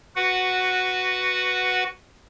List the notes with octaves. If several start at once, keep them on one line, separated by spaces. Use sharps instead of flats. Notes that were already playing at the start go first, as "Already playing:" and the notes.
F#4 B4 F#5